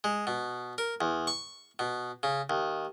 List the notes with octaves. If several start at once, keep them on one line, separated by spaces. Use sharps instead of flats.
G#3
B2
A#4
E2
C#6
B2
C#3
D#2